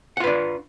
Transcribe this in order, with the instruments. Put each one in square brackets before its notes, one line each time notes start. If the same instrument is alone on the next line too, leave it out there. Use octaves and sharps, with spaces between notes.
[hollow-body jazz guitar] F#5
F4
B4
D4